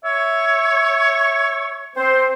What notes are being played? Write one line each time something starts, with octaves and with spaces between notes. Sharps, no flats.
C#5 E5
C4 C5